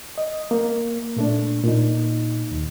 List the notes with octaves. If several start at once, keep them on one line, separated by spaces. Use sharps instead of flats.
D#5
A#3
A#2 A3 D4
A#2 D#4
D#2